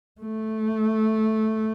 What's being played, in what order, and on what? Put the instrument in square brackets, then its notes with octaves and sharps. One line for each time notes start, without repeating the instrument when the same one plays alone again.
[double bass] A3